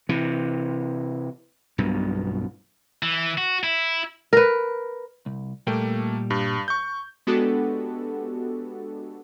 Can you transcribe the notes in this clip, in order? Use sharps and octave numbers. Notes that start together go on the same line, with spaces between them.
C3 E3
B1 G2 B2
E3
F#4
E4
A#4 B4
C2
A#2 G3 A3 A#3 G5
G2
C#6 G6
G#3 B3 D4 F#4 G4 A4